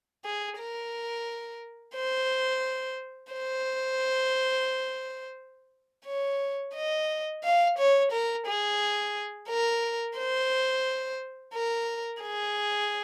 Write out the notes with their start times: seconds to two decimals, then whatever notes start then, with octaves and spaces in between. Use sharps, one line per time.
0.25 G#4
0.59 A#4
1.96 C5
3.33 C5
6.06 C#5
6.75 D#5
7.44 F5
7.78 C#5
8.12 A#4
8.47 G#4
9.49 A#4
10.18 C5
11.54 A#4
12.22 G#4